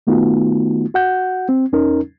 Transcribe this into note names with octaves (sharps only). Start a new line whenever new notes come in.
D#3 A3 B3 D#4 F4 F#4
F#4 F#5 G6
C4
E2 C#4 D#4 A#4